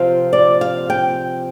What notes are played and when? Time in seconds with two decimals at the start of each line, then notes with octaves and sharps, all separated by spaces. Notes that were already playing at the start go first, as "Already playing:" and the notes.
Already playing: C3 F3 C4 F5
0.33 D5
0.61 F5
0.90 G5